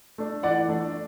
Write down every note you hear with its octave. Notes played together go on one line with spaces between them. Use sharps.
A3 D4
E3 D5 F#5
A3 D4